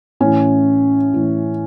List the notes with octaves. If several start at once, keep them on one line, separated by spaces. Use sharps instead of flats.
A2 E3 C#4
A2 E3